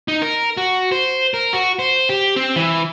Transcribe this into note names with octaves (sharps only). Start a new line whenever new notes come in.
D#4
A#4
F#4
C5
A#4
F#4
C5
G4
C4
E3